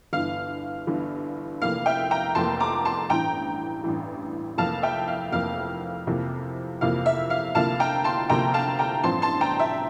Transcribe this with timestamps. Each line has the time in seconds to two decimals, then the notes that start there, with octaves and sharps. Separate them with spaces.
0.13 G1 G2 E3 F5
0.87 G1 G2 E3
1.62 F1 F2 E3 A#3 F5
1.86 E5 G5
2.11 G5 A#5
2.35 F1 F2 E3 A#3 A5 C6
2.60 A#5 D6
2.85 A5 C6
3.10 A1 G2 E3 G5 A#5
3.84 A1 G2 E3
4.58 F1 F2 E3 A#3 F5 A5
4.83 E5 G5
5.08 F5
5.32 F1 F2 E3 A#3 F5
6.07 F2 C3 E3 A#3 F4
6.81 F2 C3 E3 A#3 F4 F5
7.06 E5
7.30 F5
7.55 D2 C3 F3 A#3 E4 F5 A5
7.80 G5 A#5
8.04 A5 C6
8.29 D2 C3 F3 A#3 E4 G5 A#5
8.54 F5 A5
8.79 G5 A#5
9.03 A1 G2 F3 C4 A5 C6
9.22 A5 C6
9.41 G5 A#5
9.59 E5